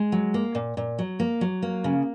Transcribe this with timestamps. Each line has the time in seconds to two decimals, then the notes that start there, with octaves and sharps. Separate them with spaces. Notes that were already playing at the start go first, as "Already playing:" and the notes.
Already playing: G#3
0.12 F#3
0.34 A#3
0.55 A#2
0.77 A#2
0.99 F#3
1.20 A#3
1.41 F#3
1.62 A#3
1.84 C#3